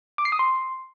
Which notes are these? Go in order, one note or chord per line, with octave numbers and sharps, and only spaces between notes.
D6
C7
D#6
C6